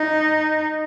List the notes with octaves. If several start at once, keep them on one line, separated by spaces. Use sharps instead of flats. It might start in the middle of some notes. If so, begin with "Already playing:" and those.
Already playing: D#4